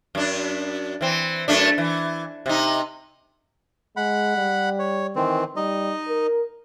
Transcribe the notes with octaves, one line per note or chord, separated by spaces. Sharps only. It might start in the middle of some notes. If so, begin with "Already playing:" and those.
F#2 D4
E3 C4
F#2 A3 D4
E3
C3 D#4
G#3 F#5 B5
G3
C#5
D#3 E3 C4
G3 D#4 D#5
A#4